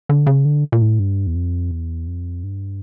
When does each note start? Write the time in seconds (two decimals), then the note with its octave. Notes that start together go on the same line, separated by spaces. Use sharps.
0.09 D3
0.27 C#3
0.45 D3
0.72 A#2
0.81 A2
0.99 G2
1.27 E2
1.35 F2
1.71 E2
2.07 F2
2.43 G2